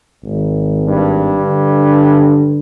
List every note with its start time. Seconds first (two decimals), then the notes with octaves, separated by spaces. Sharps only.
0.24 G#1
0.85 G2
1.40 D3